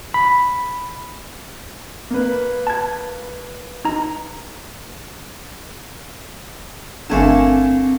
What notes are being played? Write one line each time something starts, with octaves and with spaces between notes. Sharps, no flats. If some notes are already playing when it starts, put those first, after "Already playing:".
B5
A#3 B4
A5 G#6
D#4 A#5
G1 D3 A3 A#3 C4 G#5 E7